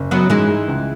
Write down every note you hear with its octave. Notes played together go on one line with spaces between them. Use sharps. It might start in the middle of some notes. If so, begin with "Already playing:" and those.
Already playing: F#1
F#2 F#3 B3
G#2 E3 G#3
G#2
C#2